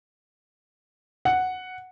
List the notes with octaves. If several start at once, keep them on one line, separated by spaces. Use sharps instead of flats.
F#5